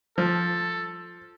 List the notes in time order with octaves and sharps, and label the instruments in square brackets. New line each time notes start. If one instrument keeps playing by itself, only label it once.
[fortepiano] F3 [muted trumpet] A4